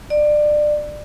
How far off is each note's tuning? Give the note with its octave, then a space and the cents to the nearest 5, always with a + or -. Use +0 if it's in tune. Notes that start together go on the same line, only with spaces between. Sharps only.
D5 +25